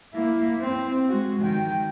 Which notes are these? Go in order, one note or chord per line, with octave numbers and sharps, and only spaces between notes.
A#3 E4
C4
G#3 F#4
D#3 G5